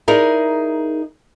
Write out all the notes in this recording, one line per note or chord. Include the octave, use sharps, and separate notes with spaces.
D#4 E4 G#4 A#4 D5 D#5